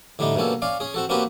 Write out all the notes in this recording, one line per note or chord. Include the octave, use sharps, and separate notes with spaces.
A2 D3 G3 D4 D#4
G2 B2 A#3 C#4 A4
C#4 D5 F5
C#4 G#4
C4 F#4 A4
A#3 C4 C#4 F#4 G4 B4